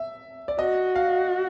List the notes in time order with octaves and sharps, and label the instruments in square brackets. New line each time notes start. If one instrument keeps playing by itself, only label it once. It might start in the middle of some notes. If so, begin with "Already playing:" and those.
Already playing: [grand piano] E5
D5
[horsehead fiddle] F#4 [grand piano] D#5
[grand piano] F5